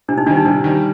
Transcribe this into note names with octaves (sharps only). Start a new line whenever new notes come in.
C3 D4
D#4
D#3 G3 D4
D#4
C3 D4
D#3 G3